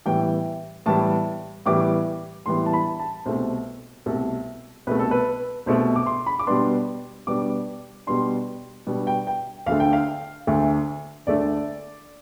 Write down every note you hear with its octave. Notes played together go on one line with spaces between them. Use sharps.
A2 E3 G3 B3 G5
A2 E3 G3 B3 A5
A2 E3 G3 B3 D6
A2 E3 G3 B3 C6
A5
B5
A5
C2 B2 A3 C5
C2 B2 A3 A4
C2 B2 A3 B4
A4
B4
C2 B2 A3 C5
D6
C6
B5
D6
B2 G3 B3 D4 C6
B2 G3 B3 D4 D6
B2 G3 B3 D4 C6
B2 G3 B3 D4
G5
G5
D2 D3 A3 F5
G5
F5
D2 D3 A3
D2 D3 A3 D5